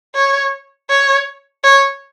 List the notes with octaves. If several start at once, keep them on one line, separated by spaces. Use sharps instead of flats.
C#5
C#5
C#5